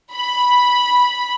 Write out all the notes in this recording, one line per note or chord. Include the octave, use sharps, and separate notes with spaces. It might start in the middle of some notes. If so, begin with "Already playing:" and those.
B5